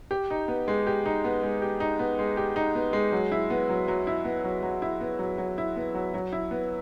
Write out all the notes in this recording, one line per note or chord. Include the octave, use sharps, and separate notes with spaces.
G4
D#4
B3
G#3
G4
D#4
B3
G#3
G4
D#4
B3
G#3
G4
D#4
B3
G#3
F#3
E4
B3
F#3
F#3
E4
B3
F#3
F#3
E4
B3
F#3
F#3
E4
B3
F#3
F#3
E4
B3